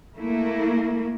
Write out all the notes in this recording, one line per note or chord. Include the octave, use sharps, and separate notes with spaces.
A3 A#3 E4